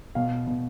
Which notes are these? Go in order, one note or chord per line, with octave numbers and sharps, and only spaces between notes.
B2 F5
B2